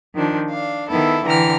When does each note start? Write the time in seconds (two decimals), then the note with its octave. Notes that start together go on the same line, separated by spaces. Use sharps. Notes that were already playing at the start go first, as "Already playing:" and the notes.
0.15 D#3 F3 D4
0.50 D4 F5
0.90 D#3 B3 E4 A4
1.26 D3 E3 G5 A#5 F6